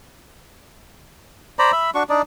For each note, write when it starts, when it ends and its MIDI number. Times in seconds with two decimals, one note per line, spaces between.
1.59 1.72 72
1.59 1.72 74
1.59 1.72 82
1.59 1.72 83
1.72 1.90 76
1.72 1.90 83
1.95 2.03 62
1.95 2.03 66
1.95 2.03 85
2.09 2.22 62
2.09 2.22 63
2.09 2.22 74